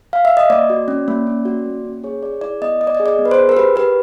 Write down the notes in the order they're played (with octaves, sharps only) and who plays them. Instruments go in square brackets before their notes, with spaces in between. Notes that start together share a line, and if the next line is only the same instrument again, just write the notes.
[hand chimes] F5
E5
D#5
A#3 D5
F#4
C#4
A#3
C#4
F#4
A#3
C#4
G#4 C#5
G#4 D5
E4 D5
B3 D#5
B3 D#5
D5
D#5
G#4
D5
B3
B4
C5
G#4
A#4
G4 B4
G4 B4